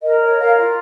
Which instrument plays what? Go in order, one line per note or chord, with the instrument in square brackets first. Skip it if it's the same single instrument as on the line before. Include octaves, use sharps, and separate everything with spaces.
[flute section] A#4 D#5
C#5
A#4 F5
F4